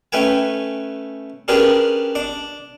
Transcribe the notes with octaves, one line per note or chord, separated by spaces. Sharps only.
A3 C#4 B4 G5 G#5
C#4 D4 G4 G#4 A#4 B4
D4 D6